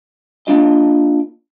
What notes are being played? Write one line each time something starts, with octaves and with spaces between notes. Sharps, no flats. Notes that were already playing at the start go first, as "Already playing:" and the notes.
A#3 C#4 D4 F4 D#5